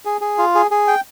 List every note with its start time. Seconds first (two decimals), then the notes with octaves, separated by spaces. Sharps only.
0.05 G#4
0.21 G#4
0.38 F4
0.55 G#4
0.71 G#4
0.88 G5